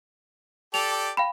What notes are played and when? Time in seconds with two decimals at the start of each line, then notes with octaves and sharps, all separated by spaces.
0.74 G4 A4 D5 F7
1.17 F5 G5 B5